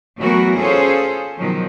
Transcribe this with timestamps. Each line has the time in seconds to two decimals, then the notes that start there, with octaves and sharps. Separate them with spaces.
0.19 E3 F#3 A3 B3 F#4 A#4
0.58 C#4 F4 G#4 A4 C5 C#5
1.38 B2 D#3 F3 F#3